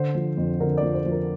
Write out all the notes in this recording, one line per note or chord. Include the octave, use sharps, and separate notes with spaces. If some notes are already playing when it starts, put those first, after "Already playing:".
Already playing: D3 C5
F3
F2
D3 A#4
D5
F3
C5
F3
A#4